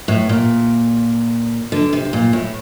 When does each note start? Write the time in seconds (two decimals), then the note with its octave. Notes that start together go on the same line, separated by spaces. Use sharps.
0.08 A2
0.29 A#2
1.72 D3
1.93 C3
2.13 A#2
2.33 A2